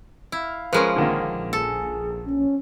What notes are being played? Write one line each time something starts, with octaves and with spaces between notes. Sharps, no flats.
E4 F5
F3 G#3 C#4 A#4 B4
A#1 D3 D#3 A#3
G#4 A4
C#4